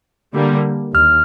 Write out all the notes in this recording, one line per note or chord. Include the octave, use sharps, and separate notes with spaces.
D3 G3 A#3
D#2 F6